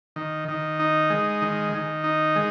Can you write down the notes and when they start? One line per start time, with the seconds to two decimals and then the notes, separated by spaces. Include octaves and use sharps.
0.16 D#3
0.48 D#3
0.79 D#4
1.10 G#3
1.42 D#3
1.73 D#3
2.04 D#4
2.36 G#3